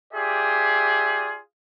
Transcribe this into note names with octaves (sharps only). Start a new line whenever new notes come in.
F4 G4 G#4 D5 E5